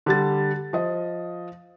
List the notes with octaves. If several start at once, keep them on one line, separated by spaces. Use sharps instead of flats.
D3 G3 A6
F3 D#5